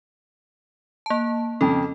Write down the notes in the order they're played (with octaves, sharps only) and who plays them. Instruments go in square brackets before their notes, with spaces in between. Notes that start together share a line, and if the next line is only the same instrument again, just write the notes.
[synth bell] A#3 A5
[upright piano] F2 C#3 [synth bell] A4